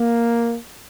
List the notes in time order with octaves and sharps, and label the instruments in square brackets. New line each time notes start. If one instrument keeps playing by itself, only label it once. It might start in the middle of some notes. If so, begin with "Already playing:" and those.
Already playing: [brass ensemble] A#3